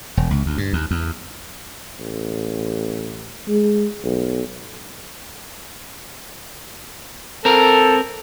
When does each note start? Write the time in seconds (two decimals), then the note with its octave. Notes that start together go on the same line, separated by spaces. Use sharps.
0.17 E1
0.31 C#2
0.46 D2
0.58 G2
0.73 D#2
0.91 E2
2.00 A1
3.48 G#3
4.04 B1
7.45 C4 A4 A#4